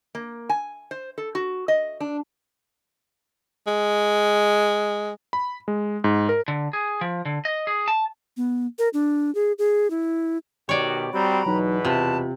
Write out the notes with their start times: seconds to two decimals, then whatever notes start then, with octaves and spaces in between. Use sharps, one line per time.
0.15 A#3
0.49 G#5
0.91 C5
1.18 A4
1.35 F#4
1.68 D#5
2.00 D4
3.67 G#3
5.33 B5
5.68 G#3
6.04 G#2
6.29 A#4
6.48 D3
6.73 G#4
7.01 F3
7.25 D3
7.45 D#5
7.67 G#4
7.88 A5
8.37 B3
8.79 A#4
8.94 D4
9.35 G#4
9.59 G#4
9.90 E4
10.69 B2 D#3 F#4 G4 C#5 D5
11.13 G3 C4 F#4 G5 A#5 B5
11.46 E2 B2 F#3 D#4 B4
11.85 C3 F4 A5